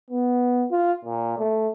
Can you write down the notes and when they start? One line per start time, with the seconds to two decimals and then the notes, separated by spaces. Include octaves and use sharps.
0.10 B3
0.71 F4
1.05 A#2
1.39 A3